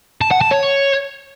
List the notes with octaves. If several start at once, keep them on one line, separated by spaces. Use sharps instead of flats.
A5
F#5
A5
C#5